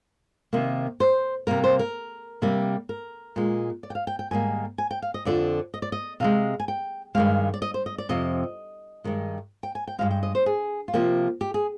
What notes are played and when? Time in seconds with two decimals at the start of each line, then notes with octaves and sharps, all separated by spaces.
0.53 C3 D#3 A#3
1.00 C5
1.47 C3 G3 A#3 A#4
1.64 C5
1.79 A#4
2.42 C3 G3 A#3
2.89 A#4
3.36 A#2 G#3
3.83 D5
3.90 G5
3.95 F5
4.07 G5
4.19 G5
4.31 G#2 D#3 G3 A#3 G#5
4.78 G#5
4.91 G5
5.02 F5
5.14 D#5
5.25 F2 D3 F3 D5
5.74 D#5
5.82 D5
5.92 D#5
6.20 C3 F3 G#3 F5
6.60 G#5
6.68 G5
7.15 G2 D#3 G#3 F5
7.54 D5
7.62 D#5
7.74 C5
7.86 D#5
7.98 D5
8.09 F2 C3 F3 D#5
9.04 G2 D#3 G#3
9.63 G5
9.75 G#5
9.87 G5
9.99 G2 F3 G#3 F5
10.11 G5
10.23 D#5
10.35 C5
10.46 G#4
10.88 F4
10.94 C3 F3 A#3 G4
11.41 G4
11.54 G#4